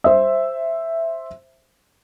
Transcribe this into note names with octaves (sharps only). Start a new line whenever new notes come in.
C5 E5